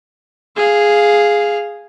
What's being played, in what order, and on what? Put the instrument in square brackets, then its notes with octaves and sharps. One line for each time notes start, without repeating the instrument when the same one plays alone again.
[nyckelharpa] G#4 F5